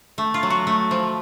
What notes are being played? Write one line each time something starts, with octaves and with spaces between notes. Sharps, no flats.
A3
F4
F#3
F#4
A3
F3